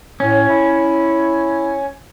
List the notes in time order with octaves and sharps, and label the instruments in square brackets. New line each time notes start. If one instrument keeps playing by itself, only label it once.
[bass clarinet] A2 [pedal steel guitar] C#4
[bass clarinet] E4